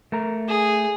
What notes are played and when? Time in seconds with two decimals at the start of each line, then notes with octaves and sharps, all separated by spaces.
0.12 A3 A#4 A#5
0.48 G#4